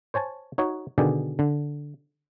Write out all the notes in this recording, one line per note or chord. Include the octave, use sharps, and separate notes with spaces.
C5 C#5 G#5 A5
D#4 F#4 C#5
B2 D3 D#3 G#4 D5 G5
D3